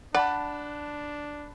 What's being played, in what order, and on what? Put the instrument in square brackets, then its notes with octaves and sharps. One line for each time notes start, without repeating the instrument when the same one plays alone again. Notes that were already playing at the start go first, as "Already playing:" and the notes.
[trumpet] D4 [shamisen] D5 [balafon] F#5 [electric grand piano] A5 B5 F#6